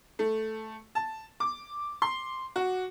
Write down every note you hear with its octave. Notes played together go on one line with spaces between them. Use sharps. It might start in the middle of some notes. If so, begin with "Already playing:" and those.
A3
A5
D6
C6
F#4